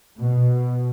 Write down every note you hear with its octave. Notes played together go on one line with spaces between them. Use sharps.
B2